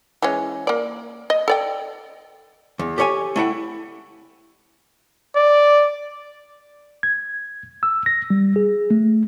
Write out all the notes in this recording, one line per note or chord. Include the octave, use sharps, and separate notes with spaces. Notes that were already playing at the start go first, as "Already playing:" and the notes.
E3 G#3 C#4
A#3 D5
D#5
A4 D5 G5
E2
G4 A4 C#5 E5 G#5
A3 E4 F#5 G5
D5
G#6
E6
A#6
G3
G#4
A3